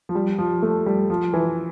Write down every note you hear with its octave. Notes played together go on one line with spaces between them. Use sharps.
F3
G3
F3
A3
G3
F3
E3